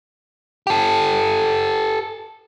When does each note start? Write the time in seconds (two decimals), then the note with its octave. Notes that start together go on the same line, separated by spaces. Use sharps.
0.67 G4 A4